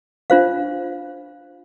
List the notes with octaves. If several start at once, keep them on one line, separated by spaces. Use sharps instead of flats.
D4 F4 C5 F5